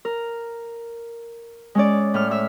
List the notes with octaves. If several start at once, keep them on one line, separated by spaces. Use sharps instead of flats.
A#4
G#3 C#4 D5
A2 F6
E5 E6 F6